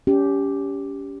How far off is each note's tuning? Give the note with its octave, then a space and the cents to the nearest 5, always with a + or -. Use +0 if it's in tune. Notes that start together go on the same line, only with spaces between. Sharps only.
C#4 +30 G4 +0